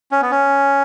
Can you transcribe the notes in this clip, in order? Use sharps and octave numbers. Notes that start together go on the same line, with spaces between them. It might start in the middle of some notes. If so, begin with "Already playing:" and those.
C#4
B3
C#4